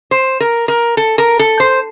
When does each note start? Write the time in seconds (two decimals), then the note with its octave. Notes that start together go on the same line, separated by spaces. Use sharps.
0.11 C5
0.40 A#4
0.68 A#4
0.97 A4
1.18 A#4
1.39 A4
1.60 C5